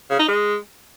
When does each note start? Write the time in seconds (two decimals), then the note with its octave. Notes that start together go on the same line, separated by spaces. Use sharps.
0.10 C#3
0.19 D#4
0.28 G#3